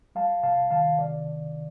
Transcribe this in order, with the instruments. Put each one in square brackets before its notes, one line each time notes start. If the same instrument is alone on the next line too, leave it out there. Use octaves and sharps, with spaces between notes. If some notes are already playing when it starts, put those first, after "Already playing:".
[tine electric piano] G3 F5 A5
C3 F5 A5
D#3 F5 A5
C3 D5